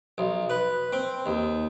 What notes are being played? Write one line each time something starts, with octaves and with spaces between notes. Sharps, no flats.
B1
B4
C4
D#2